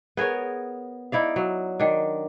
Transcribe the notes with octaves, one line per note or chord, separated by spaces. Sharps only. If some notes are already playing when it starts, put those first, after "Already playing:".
B3 G#4 A#4 C#5
D#4 E4 D5 F5
F#3
D#3 D4